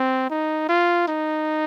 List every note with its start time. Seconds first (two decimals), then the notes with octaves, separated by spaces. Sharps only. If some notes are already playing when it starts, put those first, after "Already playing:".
Already playing: C4
0.30 D#4
0.69 F4
1.08 D#4